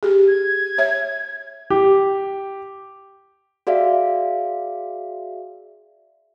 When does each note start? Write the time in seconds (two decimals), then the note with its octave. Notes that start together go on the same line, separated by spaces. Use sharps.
0.03 G4 G#4
0.28 G#6
0.78 C#5 E5
1.70 G4
3.67 F#4 G#4 D5 E5 F5